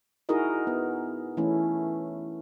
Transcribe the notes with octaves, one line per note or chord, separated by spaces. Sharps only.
D#4 E4 F#4 G#4 A#4 D#5
B3
E3 A3 C#4 E4